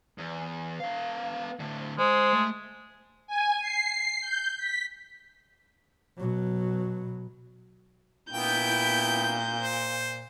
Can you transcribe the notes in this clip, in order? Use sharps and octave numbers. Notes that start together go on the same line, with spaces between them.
E2
B3 F5
A2 D3
G#3 C5
A3
G#5
C7
G6
B6
B2 F#3
A#2 B3 E4 G5 G6
C5